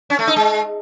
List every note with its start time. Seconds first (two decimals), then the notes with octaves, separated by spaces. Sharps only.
0.10 C#4
0.19 A3
0.27 D#4
0.36 G#3